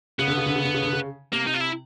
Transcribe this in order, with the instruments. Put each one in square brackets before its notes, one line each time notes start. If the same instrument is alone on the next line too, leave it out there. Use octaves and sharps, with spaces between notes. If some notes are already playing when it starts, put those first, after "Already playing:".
[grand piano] C#3 [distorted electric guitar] B3
[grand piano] D3
C#3
D3
C#3
D3
C#3
D3
C#3
[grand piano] C3 [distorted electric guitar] A#3
[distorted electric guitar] D#4
F4
E4